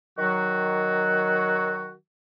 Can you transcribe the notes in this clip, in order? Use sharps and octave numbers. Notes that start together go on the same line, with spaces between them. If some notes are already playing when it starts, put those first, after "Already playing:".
D#3 F#3 F#4